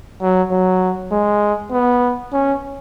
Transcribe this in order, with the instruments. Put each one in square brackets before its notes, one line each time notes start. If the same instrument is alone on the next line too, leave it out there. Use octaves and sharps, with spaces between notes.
[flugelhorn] F#3
F#3
G#3
B3
C#4